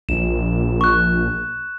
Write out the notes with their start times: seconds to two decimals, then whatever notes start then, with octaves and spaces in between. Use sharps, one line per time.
0.09 A#1 E7
0.81 C#6 F#6